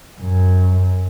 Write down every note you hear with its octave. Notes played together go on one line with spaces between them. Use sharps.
F#2